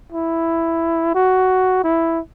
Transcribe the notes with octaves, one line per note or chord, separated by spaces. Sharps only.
E4
F#4
E4